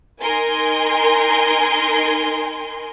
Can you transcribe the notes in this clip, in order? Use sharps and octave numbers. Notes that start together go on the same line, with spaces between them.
D#4 A#4 G#5 C6